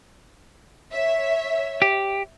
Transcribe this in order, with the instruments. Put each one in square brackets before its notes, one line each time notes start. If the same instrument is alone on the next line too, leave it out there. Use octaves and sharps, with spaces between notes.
[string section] C#5 E5
[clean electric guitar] G4